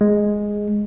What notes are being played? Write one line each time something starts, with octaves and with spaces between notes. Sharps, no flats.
G#3